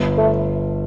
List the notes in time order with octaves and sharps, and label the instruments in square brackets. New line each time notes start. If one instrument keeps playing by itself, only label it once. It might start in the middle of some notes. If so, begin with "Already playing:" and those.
Already playing: [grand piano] G1
[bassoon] A3